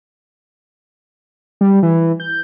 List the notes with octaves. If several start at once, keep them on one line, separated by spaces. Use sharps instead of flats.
G3
E3
G6